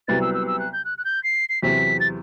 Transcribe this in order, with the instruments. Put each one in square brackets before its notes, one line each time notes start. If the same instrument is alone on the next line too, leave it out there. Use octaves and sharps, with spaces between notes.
[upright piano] C2 C3 F#3 B3 [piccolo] A6
[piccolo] E6
E6
E6
F#6
G6
F#6
F#6
G6
C7
C7
[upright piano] E2 C3 F#3 C4 E4 [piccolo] B6
[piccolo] A6